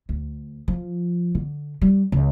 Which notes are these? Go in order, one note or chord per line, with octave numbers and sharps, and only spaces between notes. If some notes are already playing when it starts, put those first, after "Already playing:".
D2
F3
D3
G3
C#2